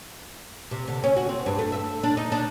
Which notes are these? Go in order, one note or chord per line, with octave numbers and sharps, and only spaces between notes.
C3
D3
C#4
F#4
C4
G2
A3
E5
D4
D#4
D4